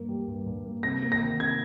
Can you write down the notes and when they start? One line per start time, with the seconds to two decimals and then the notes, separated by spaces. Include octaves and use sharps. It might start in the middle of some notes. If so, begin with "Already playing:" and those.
Already playing: G2 A#3
0.09 G3
0.28 G2
0.46 G2
0.65 A#3
0.83 C3 A#6
1.03 A#3
1.12 A#6
1.20 D#3
1.39 C3 G#6